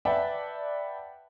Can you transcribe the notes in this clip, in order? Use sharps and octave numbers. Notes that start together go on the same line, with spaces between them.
B4 D5 E5 F#5 G5 A5